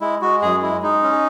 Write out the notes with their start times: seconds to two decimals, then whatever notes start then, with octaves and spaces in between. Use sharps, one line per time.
0.01 G#3 E4
0.22 G#3 F#4
0.42 F#2 G#4
0.62 G#3 E4
0.83 G#3 D#4
1.03 C#4